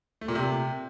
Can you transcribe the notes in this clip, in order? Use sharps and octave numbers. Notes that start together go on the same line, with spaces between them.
A3
A#2
C3